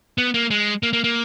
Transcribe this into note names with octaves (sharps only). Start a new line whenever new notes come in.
B3
A#3
G#3
A#3
A#3
A#3